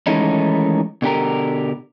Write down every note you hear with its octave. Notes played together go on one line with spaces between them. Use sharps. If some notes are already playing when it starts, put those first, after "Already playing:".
D#3 E3 G#3 A3 C#4 D#4
B2 D3 G4 A#4